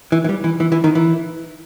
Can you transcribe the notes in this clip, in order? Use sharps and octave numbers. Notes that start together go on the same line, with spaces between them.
E3
E3
G3
E3
E3
E3
D#3
E3